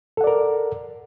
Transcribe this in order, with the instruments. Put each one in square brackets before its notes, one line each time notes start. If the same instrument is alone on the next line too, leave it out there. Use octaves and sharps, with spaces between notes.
[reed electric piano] A4
F#5
D5
A#4